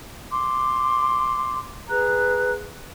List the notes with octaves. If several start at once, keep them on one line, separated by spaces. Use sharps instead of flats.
C6 D6
G#4 B4 A#5 F#6